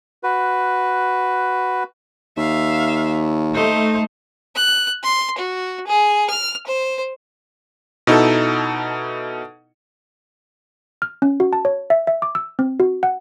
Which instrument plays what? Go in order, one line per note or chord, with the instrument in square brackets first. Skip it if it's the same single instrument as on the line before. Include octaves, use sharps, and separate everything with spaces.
[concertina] F#4 B4
[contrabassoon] D#2 [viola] E5 F5
[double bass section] A3 [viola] D#4 C5
[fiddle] F#6
C6
F#4
G#4
F6
C5
[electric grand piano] B2 D#4 E4 A4
[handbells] F6
C#4
F#4
A5
C#5
E5
E5
D6
E6
C4
F#4
F#5